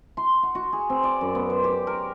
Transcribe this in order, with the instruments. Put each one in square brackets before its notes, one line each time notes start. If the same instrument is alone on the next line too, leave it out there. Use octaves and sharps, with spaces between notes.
[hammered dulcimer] C6
F#5
F#4
G#4
C4
D5
F#2
B3
C5
G4
A#4